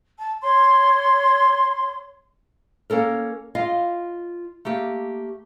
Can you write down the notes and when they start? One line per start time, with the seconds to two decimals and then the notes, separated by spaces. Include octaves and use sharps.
0.16 A5
0.42 C#5 C6
2.90 A#3 C#4 A4 A#4
3.55 F4 D#5 F5
4.65 A3 A#3 G4